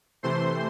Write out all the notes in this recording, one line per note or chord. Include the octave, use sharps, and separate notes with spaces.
C3 E3 A3 C5 C6